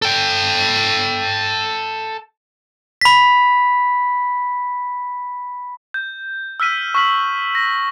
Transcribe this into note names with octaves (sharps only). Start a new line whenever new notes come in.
A4 G5
B5 B6
G6
E6 F6 B6 D#7
C#6 F6 B6 F#7
A#6